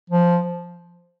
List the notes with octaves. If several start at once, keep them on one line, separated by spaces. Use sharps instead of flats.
F3